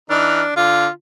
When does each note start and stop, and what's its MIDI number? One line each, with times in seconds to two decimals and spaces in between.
0.10 0.42 52
0.10 0.54 62
0.10 0.42 63
0.10 0.42 89
0.56 0.87 50
0.56 0.89 65